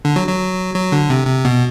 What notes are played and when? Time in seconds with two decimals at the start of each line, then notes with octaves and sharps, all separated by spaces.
0.05 D3
0.16 F#3
0.27 F#3
0.75 F#3
0.92 D3
1.10 C3
1.27 C3
1.45 B2